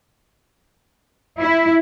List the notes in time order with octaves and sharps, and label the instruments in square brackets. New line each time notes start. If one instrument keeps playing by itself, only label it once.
[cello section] E4